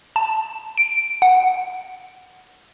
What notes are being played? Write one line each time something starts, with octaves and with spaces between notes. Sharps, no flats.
A5
D7
F#5